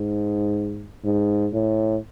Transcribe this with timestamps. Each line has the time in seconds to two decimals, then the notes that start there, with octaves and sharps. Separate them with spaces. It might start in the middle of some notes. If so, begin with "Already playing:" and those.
Already playing: G#2
1.05 G#2
1.53 A2